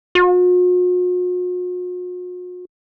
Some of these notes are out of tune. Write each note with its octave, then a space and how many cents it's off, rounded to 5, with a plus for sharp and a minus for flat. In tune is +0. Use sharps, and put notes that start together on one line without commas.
F#4 -45